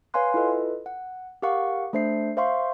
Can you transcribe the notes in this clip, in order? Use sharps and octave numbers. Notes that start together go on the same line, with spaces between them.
B4 C#5 F5 G#5 C6 F#6
E4 F4 A4 B4 D#5
F#5
G4 A#4 F5 F#5 C#6
A3 D4 C5 E5 C7
C5 E5 F5 C6 C#6